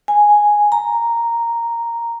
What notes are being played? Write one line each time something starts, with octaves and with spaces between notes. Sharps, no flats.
G#5
A#5